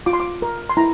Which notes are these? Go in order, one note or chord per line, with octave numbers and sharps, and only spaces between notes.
F4 D6
C6
D6
A#4
C6
E4 A#5